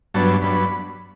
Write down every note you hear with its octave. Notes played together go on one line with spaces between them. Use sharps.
G2 F#3 B3 D4 A5
G2 F#3 B3 D4 B5